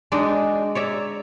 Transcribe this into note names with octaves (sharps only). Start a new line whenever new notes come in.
G#3 D4 D#4 F#4 D5
C#5 D5 E5 A#5